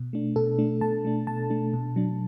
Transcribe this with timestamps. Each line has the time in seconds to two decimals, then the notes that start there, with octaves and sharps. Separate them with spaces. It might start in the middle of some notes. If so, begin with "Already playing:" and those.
Already playing: B2
0.13 A3 D4
0.36 B2 A4
0.59 A3 D4
0.81 B2 A5
1.05 A3 D4
1.27 B2 A5
1.50 A3 D4
1.73 B2
1.96 F#3 D4